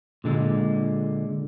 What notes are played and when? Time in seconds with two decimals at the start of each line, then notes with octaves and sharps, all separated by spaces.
0.24 A#2 D3 G#3